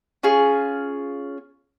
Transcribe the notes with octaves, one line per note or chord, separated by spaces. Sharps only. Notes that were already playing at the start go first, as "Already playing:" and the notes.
C#4 F4 G#4